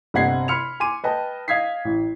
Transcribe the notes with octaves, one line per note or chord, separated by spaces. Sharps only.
G1 C3 D#5 F#5 G#6 C7
B5 C6 F6 C#7 F7
G#5 C6 D6 D#7
B4 D#5 G5 A5
D#5 F5 D#6 G#6 B6 C7
A1